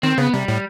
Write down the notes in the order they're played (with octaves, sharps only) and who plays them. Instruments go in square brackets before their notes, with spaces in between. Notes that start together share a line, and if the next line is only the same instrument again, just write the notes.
[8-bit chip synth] D#3 [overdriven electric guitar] C4
[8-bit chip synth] C#3 [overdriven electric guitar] B3
[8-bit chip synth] C3 [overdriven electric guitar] G3
[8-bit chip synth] A2